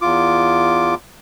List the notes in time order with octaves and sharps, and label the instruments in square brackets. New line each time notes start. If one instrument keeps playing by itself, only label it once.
[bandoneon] E2 F4 D6